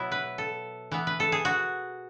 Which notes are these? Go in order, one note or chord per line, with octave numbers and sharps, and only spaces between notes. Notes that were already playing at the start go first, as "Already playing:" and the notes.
Already playing: B2 F#3 B3 E4
B4
A4
E3 B3
B4
A4
G#4
F#4